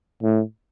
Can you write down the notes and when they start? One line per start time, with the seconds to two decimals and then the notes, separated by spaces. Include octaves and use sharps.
0.23 A2